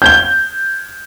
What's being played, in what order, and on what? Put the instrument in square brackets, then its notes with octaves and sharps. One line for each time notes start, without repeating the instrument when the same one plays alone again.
[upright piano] G6 G#6 G7